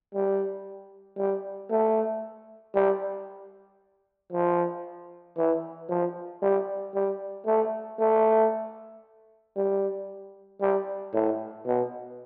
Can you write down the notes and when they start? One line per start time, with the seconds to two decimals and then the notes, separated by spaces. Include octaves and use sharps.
0.14 G3
1.18 G3
1.70 A3
2.75 G3
4.32 F3
5.37 E3
5.89 F3
6.42 G3
6.94 G3
7.46 A3
7.99 A3
9.56 G3
10.61 G3
11.13 A2
11.66 B2